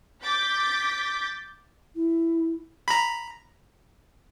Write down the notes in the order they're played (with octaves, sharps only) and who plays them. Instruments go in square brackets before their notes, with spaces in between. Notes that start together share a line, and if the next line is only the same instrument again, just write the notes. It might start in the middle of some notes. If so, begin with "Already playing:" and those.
[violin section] D6 G6 A6 B6
[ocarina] E4
[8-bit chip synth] A#5 B5